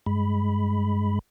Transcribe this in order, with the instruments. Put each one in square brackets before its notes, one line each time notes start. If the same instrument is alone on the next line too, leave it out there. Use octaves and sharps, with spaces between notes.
[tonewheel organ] G2 G#3 B5